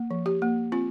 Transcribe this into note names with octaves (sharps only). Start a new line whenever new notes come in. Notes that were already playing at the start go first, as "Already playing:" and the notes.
Already playing: A#3
F3
G4
A#3
C4 F4